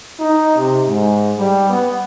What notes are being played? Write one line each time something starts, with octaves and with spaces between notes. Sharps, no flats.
D#4
C3
G#2
G3
B3